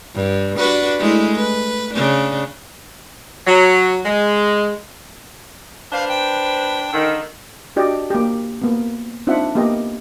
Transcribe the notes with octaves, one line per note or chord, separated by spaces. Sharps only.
G2
D4 F#4 B4
G#3 A3 E4
B4
C#3 D4
F#3
G#3
D4 B4 C5 F5
G5
D3 D#3
D4 F#4 G4 D5 D#5
A#3 G4
A#3 B3
C4 D4 D#4 F4 E5 F#5
A#3 B3 G4 D#5